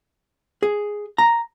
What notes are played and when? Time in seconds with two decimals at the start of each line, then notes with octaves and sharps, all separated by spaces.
0.63 G#4
1.18 A#5